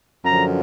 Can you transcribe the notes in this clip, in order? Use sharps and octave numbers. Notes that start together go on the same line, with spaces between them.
F#2 D3 F3 A#5